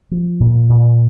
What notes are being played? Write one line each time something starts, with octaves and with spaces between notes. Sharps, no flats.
F3
A#2
A#2